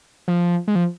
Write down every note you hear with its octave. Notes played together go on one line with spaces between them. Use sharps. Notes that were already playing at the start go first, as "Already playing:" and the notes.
F3
G#3
F3